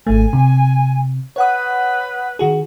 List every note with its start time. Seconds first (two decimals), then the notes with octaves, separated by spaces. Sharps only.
0.07 G#1 A3 G#5
0.33 C3
1.36 B4 C#5 F#5 D#6
2.39 D#3 F#4 G#4